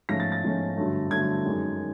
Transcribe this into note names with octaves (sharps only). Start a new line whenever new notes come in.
G#2 F3 A3 C#4 A#6
A6
A6
G#2 F3 A3 C#4
G2 D3 F#3 A3
G2 D3 F#3 A3 G#6
F#2 D#3 G#3
D#3